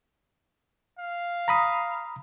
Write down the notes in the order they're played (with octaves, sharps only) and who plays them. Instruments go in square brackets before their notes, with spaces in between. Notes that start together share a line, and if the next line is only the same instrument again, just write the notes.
[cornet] F5
[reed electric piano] A#5 B5 D#6